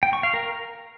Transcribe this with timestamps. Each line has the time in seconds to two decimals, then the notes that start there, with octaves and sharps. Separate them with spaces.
0.03 G5
0.13 C#6
0.23 F5
0.34 A#4